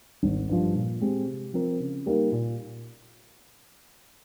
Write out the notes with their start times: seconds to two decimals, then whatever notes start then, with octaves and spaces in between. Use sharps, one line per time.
0.23 G#1
0.49 G2 F3
0.75 A#2
1.01 G#3 C4 G4
1.27 C3
1.53 F3 C4 F4 A#4
1.80 C#3
2.06 G3 A#3 D#4 A#4
2.32 A#2